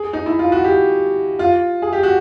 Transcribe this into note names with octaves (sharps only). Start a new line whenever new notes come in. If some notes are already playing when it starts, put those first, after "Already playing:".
Already playing: G#4
D#4
E4
F4
F#4
G4
F4
G#4
G4
F#4